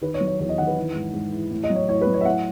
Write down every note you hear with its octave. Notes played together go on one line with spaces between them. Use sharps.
D#3 B4
C#5
F#3
C#5
E2 C#5
D#5
D#3 F#5
B4
E3
G#2
G#2
E3
A2
D#5
F#3
C#5
A2 C#5
B4
F#3
C#5
E5
A2 F#5